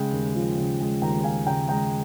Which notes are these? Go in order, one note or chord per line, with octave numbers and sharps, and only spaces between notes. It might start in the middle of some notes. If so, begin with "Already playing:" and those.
Already playing: C#3 G#3 G5
D#2
F3
C#3
G#3
D#2 G5 A#5
F3 F5 G#5
C#3 G5 A#5
G#3 G5 A#5